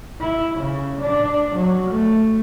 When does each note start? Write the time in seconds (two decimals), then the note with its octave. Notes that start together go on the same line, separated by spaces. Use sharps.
0.20 E4
0.58 C#3
1.01 D4
1.55 F#3
1.90 A3